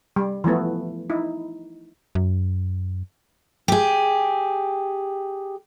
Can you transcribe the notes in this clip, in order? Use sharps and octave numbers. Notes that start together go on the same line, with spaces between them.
G3
E3 F3 A3 B3
D#4 E4
F#2
G4 G#4